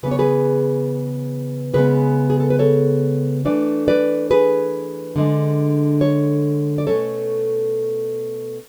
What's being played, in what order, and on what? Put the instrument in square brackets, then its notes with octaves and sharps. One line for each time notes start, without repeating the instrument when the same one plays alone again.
[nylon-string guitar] C#3 E3 B3 B4
C#5
G#4 B4
C#3 G#3 B3 G#4 B4
G#4
A4
B4
A4 C#5
E3 A3 D4 B4 D5
B4 D5
G#4 B4
D3 G#3 D4
A4 C#5
D5
B2 A3 C#4 A4 C#5